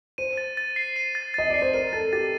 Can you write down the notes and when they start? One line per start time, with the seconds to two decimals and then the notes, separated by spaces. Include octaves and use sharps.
0.18 C5 D#7
0.37 A6
0.57 A6
0.76 C7
0.96 D#7
1.15 A6
1.34 D#5 A6
1.50 D5 C7
1.62 C5
1.74 A#4 D#7
1.93 A4 A6
2.13 G4 A6